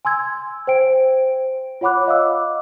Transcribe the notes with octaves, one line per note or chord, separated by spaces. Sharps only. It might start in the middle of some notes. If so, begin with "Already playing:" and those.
G#5 C6 E6 G#6
C5 G5 D7
F4 C#5 F#5 B5 D6 F#6
D#5 F5 D6 E6